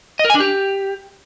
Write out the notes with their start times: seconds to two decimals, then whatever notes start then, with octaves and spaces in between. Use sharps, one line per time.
0.19 D#5
0.25 A#4
0.30 G#5
0.35 D4
0.40 G4